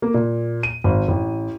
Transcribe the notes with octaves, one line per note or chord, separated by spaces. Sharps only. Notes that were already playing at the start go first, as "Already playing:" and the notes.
A#3
A#2
D#7
G#1
A1